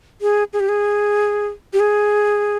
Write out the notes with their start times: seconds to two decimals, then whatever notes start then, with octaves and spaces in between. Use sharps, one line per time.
0.21 G#4
0.53 G#4
0.60 G4
0.69 G#4
1.73 G4
1.80 G#4